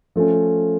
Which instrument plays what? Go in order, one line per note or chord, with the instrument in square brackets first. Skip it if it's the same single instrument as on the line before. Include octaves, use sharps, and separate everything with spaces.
[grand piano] F3 A3 C#4